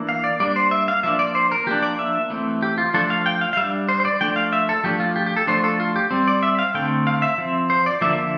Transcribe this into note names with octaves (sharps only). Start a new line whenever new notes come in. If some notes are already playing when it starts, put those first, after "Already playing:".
Already playing: E3 A#3 D4
F5
D5
G3 A#3 D4 D5
C5
E5
F5
F3 A#3 D4 E5
D5
C5
A#4
F3 A#3 D4 G4
D5
E5
E3 A3 C4
G4
F4
F3 A3 D4 A4
F5
G5
F5
F5
G3 D4 E5
C5
C5
D5
F3 A3 D4 G5
F5
E5
A4
F3 A3 D4 G4
F4
G4
G4
A4
F3 A3 D4 C5
A4
F4
G4
G3 C4
D5
E5
F5
D3 A3 C4 G5
F5
E5
F3 C4
C5
D5
D3 F3 A#3 D4 E5
E5